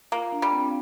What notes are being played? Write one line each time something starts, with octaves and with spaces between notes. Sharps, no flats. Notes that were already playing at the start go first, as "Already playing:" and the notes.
A#3 F4
D4
G3
C4